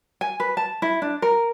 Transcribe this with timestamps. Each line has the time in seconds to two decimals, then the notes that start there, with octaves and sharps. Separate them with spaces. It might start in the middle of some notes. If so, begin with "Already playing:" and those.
0.21 G#5
0.40 B4
0.57 A5
0.82 E4
1.02 D4
1.22 A#4